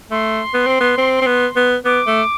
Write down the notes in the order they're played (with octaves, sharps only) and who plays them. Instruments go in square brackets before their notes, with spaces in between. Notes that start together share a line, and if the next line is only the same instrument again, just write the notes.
[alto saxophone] A3 [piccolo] C6
[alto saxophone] B3
C4
B3
C4
C4
B3
B3
[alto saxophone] B3 [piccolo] D6
[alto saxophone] A3